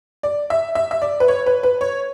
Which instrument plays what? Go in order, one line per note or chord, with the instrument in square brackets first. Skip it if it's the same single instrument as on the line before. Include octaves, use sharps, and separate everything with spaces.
[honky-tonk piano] D5
E5
E5
E5
D5
B4
C#5
B4
B4
C#5